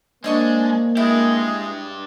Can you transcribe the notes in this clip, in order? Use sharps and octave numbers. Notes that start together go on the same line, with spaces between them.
G#3 A#3 D4 C5 D#5 C#6
G#3 D4 E4 G4